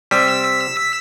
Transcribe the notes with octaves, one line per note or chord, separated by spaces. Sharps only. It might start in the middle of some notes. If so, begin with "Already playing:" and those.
C3 G3 E6 B6